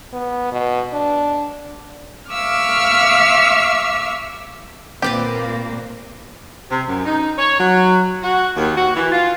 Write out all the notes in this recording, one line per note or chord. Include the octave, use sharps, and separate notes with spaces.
B3
B2
D4
E5 F5 C#6 D6 E6 F6
A#2 A#3 C4 G4 B4 D5
C3
F#2
D#4
C#5
F#3
F#4
D#2
F#4
E3
F4